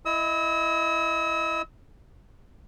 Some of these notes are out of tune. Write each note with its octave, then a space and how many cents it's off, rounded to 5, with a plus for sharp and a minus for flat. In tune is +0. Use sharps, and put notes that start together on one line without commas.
E4 +10 D#5 +0 E6 -40